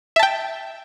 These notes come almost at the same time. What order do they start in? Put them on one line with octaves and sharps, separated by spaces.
E5 A5 G5